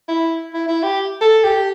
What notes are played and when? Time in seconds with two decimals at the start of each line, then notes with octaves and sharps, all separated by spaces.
0.08 E4
0.54 E4
0.68 E4
0.83 G4
1.21 A4
1.44 G4